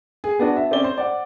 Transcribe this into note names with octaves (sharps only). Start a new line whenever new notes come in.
G#4
B3 D4 F#4
E5
C4 C#4 D5 G7
C5
D5 F#5